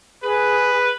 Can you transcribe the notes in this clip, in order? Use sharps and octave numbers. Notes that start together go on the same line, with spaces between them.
G#4 B4